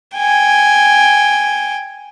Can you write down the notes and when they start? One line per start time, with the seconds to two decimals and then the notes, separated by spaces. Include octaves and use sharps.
0.17 G5 G#5